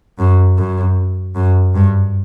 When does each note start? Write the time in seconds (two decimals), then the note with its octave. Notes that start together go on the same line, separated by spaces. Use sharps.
0.19 F#2
0.58 F#2
1.36 F#2
1.74 G2